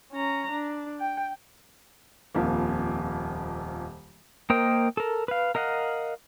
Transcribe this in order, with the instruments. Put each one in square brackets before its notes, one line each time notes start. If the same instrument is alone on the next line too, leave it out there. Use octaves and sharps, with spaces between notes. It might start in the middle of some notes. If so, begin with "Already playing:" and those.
[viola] C#4 A#5
D4
G5
[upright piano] D#1 F2 A#3
[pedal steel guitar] A#3 A#4 C5 D#5 G5
A4 A#4
B4 F5
A#4 D#5 F5 F#5